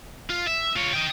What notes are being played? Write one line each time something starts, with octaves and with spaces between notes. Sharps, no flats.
F4
E5
F4 C#5
D#5 G5